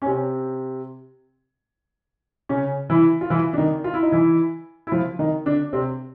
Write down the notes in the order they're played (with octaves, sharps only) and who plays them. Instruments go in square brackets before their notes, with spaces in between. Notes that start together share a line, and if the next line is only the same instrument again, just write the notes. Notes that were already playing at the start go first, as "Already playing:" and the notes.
[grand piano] C#4
C3 C4
C#3 C#4
E3 E4
F4
E3 E4
D4
D#3 D#4
F4
E4
D#4
E3 E4
E4
F3 F4
D#3 D#4
D3 D4
C3 C4